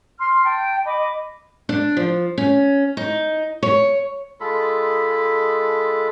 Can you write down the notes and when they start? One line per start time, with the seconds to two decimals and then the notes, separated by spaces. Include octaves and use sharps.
0.19 C6 F6
0.45 G5 A5
0.86 D#5 B5 D6
1.69 D4
1.97 F3
2.38 C#4
2.97 D#4
3.63 C#5
4.40 G#3 F4 A4 B5